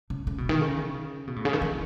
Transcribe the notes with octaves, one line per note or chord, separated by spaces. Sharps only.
C#3
C#3
B2
D#3
C#3
B2
A2
C#3
D#3
E3